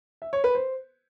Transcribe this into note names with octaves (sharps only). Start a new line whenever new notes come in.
E5
C#5
B4
C5